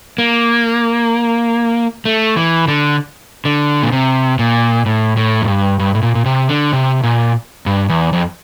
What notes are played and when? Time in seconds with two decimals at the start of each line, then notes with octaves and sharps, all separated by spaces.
0.18 A#3
2.05 A3
2.37 E3
2.68 D3
3.45 D3
3.83 A#2
3.92 C3
4.39 A#2
4.86 A2
5.17 A2
5.42 F2
5.48 G2
5.79 G2
5.95 A2
6.02 A#2
6.15 A#2
6.25 C3
6.49 D3
6.73 C3
7.03 A#2
7.66 G2
7.89 E2
8.13 F2